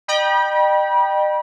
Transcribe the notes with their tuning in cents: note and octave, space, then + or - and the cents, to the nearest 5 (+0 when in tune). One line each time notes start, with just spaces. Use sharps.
D#5 -45 G5 +0 B5 -40